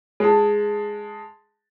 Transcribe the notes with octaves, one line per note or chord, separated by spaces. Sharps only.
G#3 A5